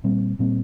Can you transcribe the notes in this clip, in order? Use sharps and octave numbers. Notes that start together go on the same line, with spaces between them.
A#2 G3 C4
A#2 G3 C4